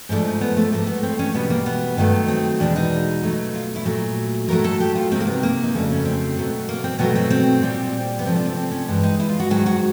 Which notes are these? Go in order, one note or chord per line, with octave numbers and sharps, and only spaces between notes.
G#2 F3 A3 D4
D#4
B3
A3
G#2 F3 A3 A#3
B3
C4
C#4
E2 B2 G3 B3
A#3
B3
G2 D#3 F#3 A3
C4
E2 B2 G#3 D4
D#4
B2 F#3 A3
F4
E4
A#2 F#3 A3
A2 F#3 A3 A#4
A4
G4
F4
C3 D#3 G#3 C4
A#3
B3
A#3
D#4
F2 C#3 F#3 A3 D4
C#4
C4
B2 F#3 A3
A#3
C4
B2 F#3 A3 B3
C4
C4
A#2 G3
B3
C3 F3 A3 C4
D4
C4
C4
C#4
G2 E3 G#3
D#4
E4
F4
F#4
G#2 D#3 F#3 F#4
F#4